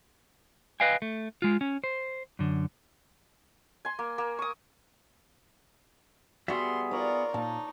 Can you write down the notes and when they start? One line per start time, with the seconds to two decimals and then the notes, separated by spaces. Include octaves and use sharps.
0.80 B4 D#5 F5 G5 G#5
1.02 A3
1.42 G#3 F4
1.61 C#4
1.84 C5
2.39 F#2 D3
3.85 G#5 C6
3.99 A#3
4.18 A#3
4.39 C#6 D#6
6.48 G3 B3 F#4 G#4 E5 C6
6.91 F4 A#4 C#5 D5
7.34 A#2 D#4 A5